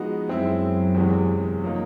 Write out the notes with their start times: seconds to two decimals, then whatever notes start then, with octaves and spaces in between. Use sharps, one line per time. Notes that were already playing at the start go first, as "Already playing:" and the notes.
Already playing: F3 G#3 B3 D#4 F#4
0.27 F#2 F#3 G#3 C4 E4
0.95 E2 C3 E3 G#3
1.63 C#3 F3 A#3 D#4